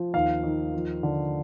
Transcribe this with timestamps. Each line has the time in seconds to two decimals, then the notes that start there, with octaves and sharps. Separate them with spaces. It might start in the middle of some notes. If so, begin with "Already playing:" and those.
Already playing: F3
0.14 D#2 F5
0.43 D#3
0.74 F3
1.03 D3